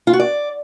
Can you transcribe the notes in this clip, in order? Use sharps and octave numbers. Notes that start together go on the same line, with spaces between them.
F4
F#4
D5